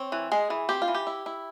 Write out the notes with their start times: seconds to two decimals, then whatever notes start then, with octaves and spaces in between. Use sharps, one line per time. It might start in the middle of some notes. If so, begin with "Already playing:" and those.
Already playing: C4 C#5
0.12 E3
0.32 G#3 G#4
0.50 E3
0.69 C4 G4
0.82 F4
0.88 E3
0.94 G4
1.07 E4
1.26 E4